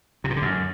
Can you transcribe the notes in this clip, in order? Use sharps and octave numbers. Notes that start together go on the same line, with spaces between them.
C3
A#2
D3
F#2